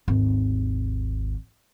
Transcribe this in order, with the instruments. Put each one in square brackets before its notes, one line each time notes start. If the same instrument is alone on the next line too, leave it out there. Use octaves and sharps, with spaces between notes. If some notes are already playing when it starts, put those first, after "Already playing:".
[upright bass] G#1 D#2